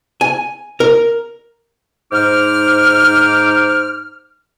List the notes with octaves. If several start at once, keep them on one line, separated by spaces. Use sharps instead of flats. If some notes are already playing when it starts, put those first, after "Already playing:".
G#5
A#4
G#2 D#4 C5 D6 F6